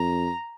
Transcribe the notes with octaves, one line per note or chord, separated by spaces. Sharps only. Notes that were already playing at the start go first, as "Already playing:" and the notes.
Already playing: F2 A#5